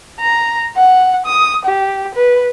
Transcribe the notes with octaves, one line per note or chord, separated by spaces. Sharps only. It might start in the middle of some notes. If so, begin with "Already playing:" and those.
A#5
F#5
D#6
G4
B4